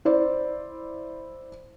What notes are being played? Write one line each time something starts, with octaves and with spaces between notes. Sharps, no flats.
E4 C5 D5